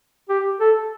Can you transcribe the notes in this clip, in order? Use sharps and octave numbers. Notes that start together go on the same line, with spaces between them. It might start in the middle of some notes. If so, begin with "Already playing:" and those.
G4
A4